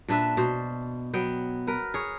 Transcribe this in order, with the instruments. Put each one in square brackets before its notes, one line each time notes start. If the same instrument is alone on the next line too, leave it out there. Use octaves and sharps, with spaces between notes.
[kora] A#2 D4 B4 E5
B2 C5
F#3 B3 G5
A#4 B4
G#4 C#5